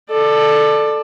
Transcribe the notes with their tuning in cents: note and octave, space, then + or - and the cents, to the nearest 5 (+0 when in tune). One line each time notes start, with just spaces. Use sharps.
A4 +0 D5 +20